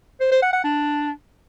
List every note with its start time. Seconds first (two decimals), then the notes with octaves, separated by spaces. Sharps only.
0.21 C5
0.31 C5
0.42 F#5
0.53 F#5
0.64 D4